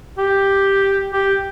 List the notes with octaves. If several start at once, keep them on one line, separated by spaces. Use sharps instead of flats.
G4
G4